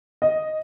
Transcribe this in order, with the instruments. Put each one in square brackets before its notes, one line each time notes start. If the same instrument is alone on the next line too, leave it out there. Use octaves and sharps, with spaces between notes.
[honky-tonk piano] D#5